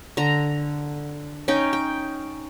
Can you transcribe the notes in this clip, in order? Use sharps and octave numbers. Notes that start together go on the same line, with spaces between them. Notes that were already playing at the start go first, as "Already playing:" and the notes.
D3 A#5
C#4 D#4 G5
G5